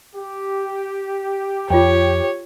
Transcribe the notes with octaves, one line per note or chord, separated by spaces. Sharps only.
G4
F2 F4 C#5 G5